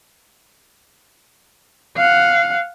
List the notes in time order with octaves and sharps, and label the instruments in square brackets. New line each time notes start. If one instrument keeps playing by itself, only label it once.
[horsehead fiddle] F5 F#5